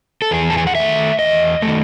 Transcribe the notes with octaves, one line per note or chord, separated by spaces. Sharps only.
A4
E2 G#4
A5
G#5
F#5
D#3 A3 E5
E2 D#5
A3
D#3